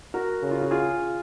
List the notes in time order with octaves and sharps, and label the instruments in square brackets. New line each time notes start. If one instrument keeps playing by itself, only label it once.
[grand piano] F#4 A#4
[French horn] C#3
[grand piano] F4
F#4
F4 G#4